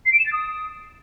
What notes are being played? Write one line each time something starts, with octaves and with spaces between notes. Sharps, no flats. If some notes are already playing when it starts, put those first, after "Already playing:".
C7
D7
E7
A6
D#6